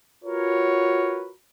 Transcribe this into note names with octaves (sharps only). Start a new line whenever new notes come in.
F4 F#4 A#4 B4 C#5